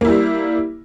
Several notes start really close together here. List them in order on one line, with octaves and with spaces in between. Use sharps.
A#3 E4 G3